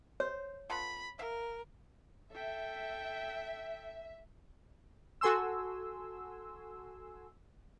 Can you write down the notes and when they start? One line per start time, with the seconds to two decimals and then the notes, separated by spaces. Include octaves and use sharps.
0.20 C5 C#5
0.70 B3 F4 A4 B5
1.19 A#4 E5 F5
2.32 A4 E5 G5
5.21 F#4 A4 G#5 C6 E6